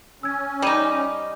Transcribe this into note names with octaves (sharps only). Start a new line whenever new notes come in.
C#4 E6 G#6
G3 D#4 D6 D#7